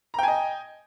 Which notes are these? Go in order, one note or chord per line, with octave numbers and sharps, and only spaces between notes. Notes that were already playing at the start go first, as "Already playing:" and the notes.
D#5 G5 G#5 A#5